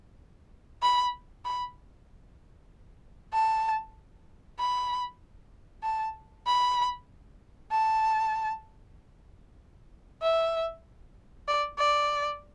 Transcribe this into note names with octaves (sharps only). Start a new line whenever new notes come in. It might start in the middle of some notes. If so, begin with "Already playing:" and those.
B5
B5
A5
B5
A5
B5
A5
E5
D5
D5